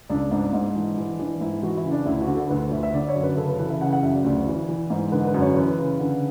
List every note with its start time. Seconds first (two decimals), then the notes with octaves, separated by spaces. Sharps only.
0.10 C#2 D4
0.31 G#2 D4
0.53 G#2
0.75 E3
0.98 E3
1.19 E3 D4
1.40 G#2 E4
1.63 E3 F#4
1.77 E4
1.84 C#3
1.92 D4
2.06 D2 E4
2.21 F#4
2.28 D3
2.35 A4
2.49 D2 B4
2.71 D2 E5
2.83 E5
2.93 D3 D5
3.08 C#5
3.15 F#2
3.23 B4
3.37 C#3 A4
3.48 B4
3.59 E3 B4
3.70 E5
3.81 C#3 F#5
3.93 F#5
4.02 F#2 E5
4.14 D5
4.24 D2
4.47 E3
4.69 E3
4.90 G#2
5.12 D3 B4
5.27 B4
5.34 F#2
5.41 C#5
5.55 E3 B4
5.78 C#3
5.99 D3